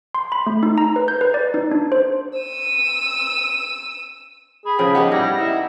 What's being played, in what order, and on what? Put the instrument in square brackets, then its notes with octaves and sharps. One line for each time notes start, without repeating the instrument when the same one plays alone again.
[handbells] C6
B5
A3
D#4
A#5
B4
G6
B4
D5
D#4
D4
C5
[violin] E6 D#7
[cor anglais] G#4 [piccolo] B5
[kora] C#3 F3 G5 [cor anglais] G#4
[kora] B3 D#4 G4
[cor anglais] G3 [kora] B3 E4 B4 [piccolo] A#6
[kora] B3 D#4 [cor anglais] E4